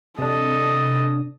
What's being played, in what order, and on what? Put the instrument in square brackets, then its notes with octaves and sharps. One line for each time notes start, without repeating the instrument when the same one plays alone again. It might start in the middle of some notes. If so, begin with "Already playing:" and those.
[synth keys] C3 D4 [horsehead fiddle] A4 D#5